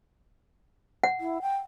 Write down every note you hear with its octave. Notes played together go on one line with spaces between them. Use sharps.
F#5
E4
G5